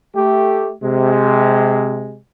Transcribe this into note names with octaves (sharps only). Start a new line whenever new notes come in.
A3 G4
C3 G#3